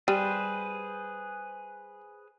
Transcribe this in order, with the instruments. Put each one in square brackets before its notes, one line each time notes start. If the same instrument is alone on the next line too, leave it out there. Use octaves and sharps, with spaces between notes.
[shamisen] G3 [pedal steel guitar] G#4 B4 C5